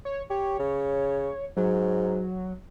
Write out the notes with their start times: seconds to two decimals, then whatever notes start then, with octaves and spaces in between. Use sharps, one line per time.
0.05 C#5
0.30 G4 C#5
0.59 C#3
1.57 G#2 F#3